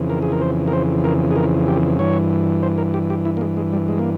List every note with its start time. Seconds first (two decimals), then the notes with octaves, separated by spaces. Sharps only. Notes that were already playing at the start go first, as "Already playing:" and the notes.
Already playing: F2 C#3 E3
0.10 A#4
0.22 G#4
0.32 A#4
0.41 C5
0.68 A#4
0.73 C5
1.04 A#4
1.31 G#4
1.36 A#4
1.68 G4
1.99 G2 E3 C#5
2.63 C5
2.78 A#4
2.94 G4
3.10 G4
3.25 E4
3.37 A#3
3.41 G#3
3.57 G#3
3.73 G3
3.88 G#3
3.99 A#3